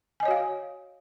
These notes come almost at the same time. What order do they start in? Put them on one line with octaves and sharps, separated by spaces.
G#5 D#5 C#5 F#4 F5